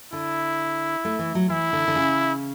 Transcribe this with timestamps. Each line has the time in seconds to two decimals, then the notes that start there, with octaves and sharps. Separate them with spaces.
0.13 D3 E4
1.05 A3
1.19 E3
1.35 F#3
1.49 E3 E4
1.73 D3
1.88 D3
1.95 C#3